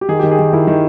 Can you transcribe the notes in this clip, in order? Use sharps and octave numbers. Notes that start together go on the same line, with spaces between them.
G4
D#3 G#4
G4
D#3
G#4
D#3
D#3 E4
D#3